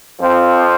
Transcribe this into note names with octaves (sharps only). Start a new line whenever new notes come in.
F2 F3 C4